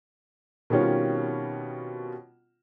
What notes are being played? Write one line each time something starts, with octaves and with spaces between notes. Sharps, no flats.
B2 D#3 G3 C4 C#4 F4